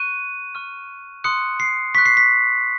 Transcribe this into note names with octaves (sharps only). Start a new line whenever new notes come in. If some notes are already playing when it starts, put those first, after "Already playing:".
Already playing: C#6 F#6 D#7
C#6 F6
C6 D#6 F#6 C#7
C7
C#6 F#6 B6
C7
B6